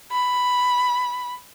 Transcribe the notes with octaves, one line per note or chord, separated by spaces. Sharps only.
B5